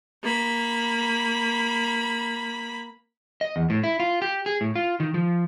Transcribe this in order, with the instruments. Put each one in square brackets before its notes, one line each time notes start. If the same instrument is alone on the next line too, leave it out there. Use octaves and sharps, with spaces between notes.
[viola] A#3 B5
[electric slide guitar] D#5
E2
A2
E4
F4
G4
G#4
A2
F4
D#3
F3